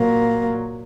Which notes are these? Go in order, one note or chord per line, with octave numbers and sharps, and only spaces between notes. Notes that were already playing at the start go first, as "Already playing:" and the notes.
Already playing: A#2 F#3 A#3